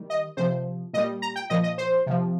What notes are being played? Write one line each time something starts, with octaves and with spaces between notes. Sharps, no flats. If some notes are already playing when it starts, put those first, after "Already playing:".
Already playing: D#3 G3
D#5
C3 F3 C5
A#2 G3 D#5
A#5
G5
A#2 F3 D#5
D#5
C5
C3 F3